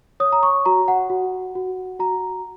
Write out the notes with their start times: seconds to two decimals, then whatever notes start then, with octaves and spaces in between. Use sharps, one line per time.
0.20 C#5 D#6
0.32 A#5
0.43 C#6
0.65 F#4 A#5
0.88 F#5
1.10 F#4
1.55 F#4
1.99 F#4 A#5